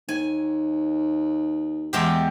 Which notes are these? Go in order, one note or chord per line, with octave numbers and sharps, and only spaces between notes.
D#2 G#5
E2 G#3 G4